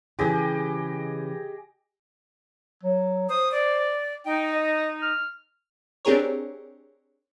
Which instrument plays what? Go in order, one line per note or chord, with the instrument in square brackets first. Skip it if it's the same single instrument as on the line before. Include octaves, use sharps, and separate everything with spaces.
[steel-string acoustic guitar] C#3 E3 [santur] G4 G#4 D#5
[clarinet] F#3
[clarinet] C5 [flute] D#6
[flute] D5
[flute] D#4 [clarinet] G5
[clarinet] D#5
F6
[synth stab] C4 D4 G4 G#4 A#4 C#5